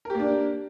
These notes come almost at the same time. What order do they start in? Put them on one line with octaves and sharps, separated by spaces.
A#4 G4 A#3 D4